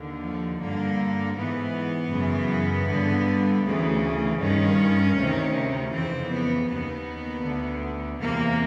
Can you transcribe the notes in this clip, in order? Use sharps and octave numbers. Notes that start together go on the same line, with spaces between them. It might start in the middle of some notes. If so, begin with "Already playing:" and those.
Already playing: D#2 D3
F3
G2 D3 A#3
G#2 E3 B3
F#2 C#3 E3
G2 D3
D2 C#3 E3
G2 D#3 C#4
D2 C3 D#3
F2 C#3 E3 C4
B3
D#2 D#3 B3
D2 D3
E2 C3 E3 A#3